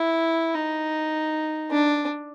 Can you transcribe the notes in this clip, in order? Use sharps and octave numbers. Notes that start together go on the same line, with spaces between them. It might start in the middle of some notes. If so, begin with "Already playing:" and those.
Already playing: E4
D#4
D4